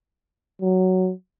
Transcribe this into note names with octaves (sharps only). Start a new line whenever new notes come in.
F#3